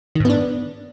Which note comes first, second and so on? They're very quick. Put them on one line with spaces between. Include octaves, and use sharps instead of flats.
D#3 G#2 B3 D4